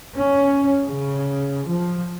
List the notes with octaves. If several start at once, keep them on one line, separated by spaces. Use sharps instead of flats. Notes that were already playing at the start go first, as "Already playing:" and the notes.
C#4
C#3
F3